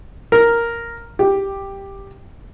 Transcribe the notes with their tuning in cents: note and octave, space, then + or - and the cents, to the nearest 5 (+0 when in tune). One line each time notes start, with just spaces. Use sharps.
A#4 +0
G4 +5